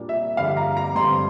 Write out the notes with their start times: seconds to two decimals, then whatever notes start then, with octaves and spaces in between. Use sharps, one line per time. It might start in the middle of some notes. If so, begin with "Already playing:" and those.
Already playing: A#2 G3 A#3 D4
0.09 E5
0.37 G2 D3 G3 F5
0.57 A#5
0.77 A#5
0.95 G2 D3 G3 C4 C6